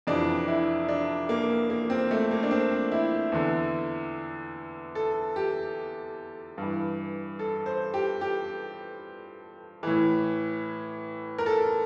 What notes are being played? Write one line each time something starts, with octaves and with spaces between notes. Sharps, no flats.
F2 C3 E3 D4
E4
D4
A#3
A#3
C4
A3
A#3
D4
C4
E4
E2 D3
A4
G4
G2 E3
A4
C5
G4
G4
A2 E3
A#4
A4